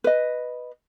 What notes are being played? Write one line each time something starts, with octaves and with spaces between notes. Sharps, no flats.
B4 D#5